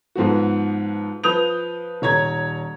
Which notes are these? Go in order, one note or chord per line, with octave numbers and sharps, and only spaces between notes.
G#2 F3 B3 F#4
F3 B4 D#6 G6 F7
D#1 C#5 A#5 G#6